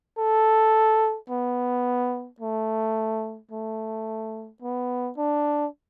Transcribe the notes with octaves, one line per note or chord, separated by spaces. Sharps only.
A4
B3
A3
A3
B3
D4